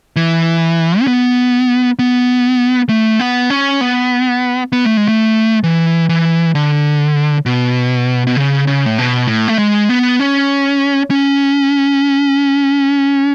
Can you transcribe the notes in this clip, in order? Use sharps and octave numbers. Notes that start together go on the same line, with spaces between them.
E3
C#4
B3
B3
A3
B3
C#4
B3
B3
A3
G#3
A3
E3
E3
D3
B2
B2
C#3
C#3
A2
B2
A2
A3
G#3
B3
C#4
C#4